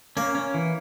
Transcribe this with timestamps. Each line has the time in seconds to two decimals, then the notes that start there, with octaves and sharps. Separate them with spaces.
0.17 A#3 C#4
0.35 C#4
0.54 E3